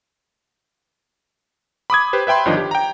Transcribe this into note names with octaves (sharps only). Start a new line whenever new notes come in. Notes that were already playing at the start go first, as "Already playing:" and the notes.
B5 D6 D#6 G#6
G4 B4 C5
B4 E5 G5 B5 C6
G1 D#3 F3 D4 D#5
G4
G5 A#5